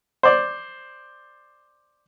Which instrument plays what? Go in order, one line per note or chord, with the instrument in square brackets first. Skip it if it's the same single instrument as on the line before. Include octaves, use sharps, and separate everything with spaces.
[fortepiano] C5 D5